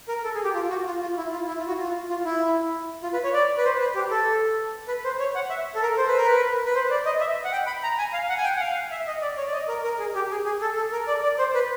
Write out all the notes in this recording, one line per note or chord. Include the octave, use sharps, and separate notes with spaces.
A#4
A4
G#4
G4
F4
F#4
F4
F4
E4
F4
E4
F4
F#4
F4
F4
E4
F4
B4
C#5
D5
B4
C5
B4
G4
A4
B4
C5
C#5
F#5
E5
A4
A#4
C5
B4
A#4
B4
B4
C5
D5
D#5
E5
F#5
G5
B5
A#5
G#5
F5
F#5
G#5
G5
F#5
F5
E5
D#5
D5
C#5
D5
D#5
A#4
A#4
G#4
G4
G#4
G#4
A4
A4
A#4
D5
D5
C5
B4